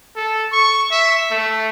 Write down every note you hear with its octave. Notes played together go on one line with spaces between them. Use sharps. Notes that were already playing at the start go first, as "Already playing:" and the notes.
A4
C#6
E5
A3